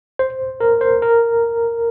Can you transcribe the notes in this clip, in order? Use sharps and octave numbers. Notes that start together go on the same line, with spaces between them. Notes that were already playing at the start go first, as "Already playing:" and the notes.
C5
A#4
C5
A#4